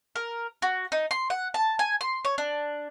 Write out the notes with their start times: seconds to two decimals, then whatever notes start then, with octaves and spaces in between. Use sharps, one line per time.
0.16 A#4
0.62 F#4
0.92 D#4
1.11 C6
1.30 F#5
1.54 A5
1.79 G#5
2.01 C6
2.25 C#5
2.38 D4